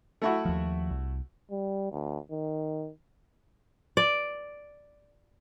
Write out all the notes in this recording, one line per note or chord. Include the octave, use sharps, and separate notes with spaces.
A3 E4 F#4
D#2 F3
C2
G3
D2
D#3
D5